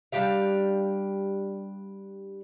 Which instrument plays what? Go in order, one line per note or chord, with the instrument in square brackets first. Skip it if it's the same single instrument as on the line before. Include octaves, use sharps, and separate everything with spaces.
[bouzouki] G3 D4 G4 F5